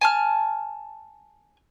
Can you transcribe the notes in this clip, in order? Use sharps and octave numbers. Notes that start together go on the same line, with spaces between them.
G#5 A5 F6